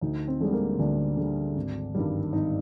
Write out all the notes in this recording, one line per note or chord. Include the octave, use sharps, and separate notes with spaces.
D2 D#4
C4
D3 G3 G#3
A#3
D2 D4
D3 G3
G#1
G2 D#3 G3
G#1 D#4